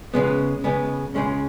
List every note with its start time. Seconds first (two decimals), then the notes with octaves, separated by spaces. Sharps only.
0.14 C#3 G#3 B3
0.64 C#3 G#3 B3
1.15 C#2 C#3 G#3 C#4